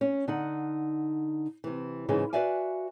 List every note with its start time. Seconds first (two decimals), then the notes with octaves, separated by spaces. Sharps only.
0.01 C#4
0.28 D3 D#4 F#5
1.64 C3 E3
2.09 G#2 C#3 E3 G#3
2.33 F#4 B4 D5 E5 F5 G#5